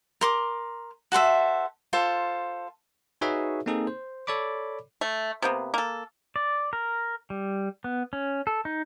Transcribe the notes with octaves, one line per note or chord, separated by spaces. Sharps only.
A#4 C6 D6
F#4 A4 C5 E5
F4 A4 C5
D#4 F#4 G#4 B4 C#5 E5
A#3 C4 D#4 G#4 A4
C5
A4 C#5 D5 B5 D6
A3
C3 A#3 B3
A#3 A4
D5
A#4
G3
B3
C#4
A4
D#4